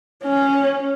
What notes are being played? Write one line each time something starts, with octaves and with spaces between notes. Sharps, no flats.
C#4